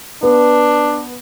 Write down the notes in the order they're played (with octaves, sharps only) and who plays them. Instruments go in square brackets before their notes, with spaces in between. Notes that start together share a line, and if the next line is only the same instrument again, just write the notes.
[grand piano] B3 [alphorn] D4